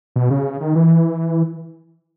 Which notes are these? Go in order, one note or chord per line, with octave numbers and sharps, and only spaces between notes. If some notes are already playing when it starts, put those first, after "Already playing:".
B2
C#3
D#3
E3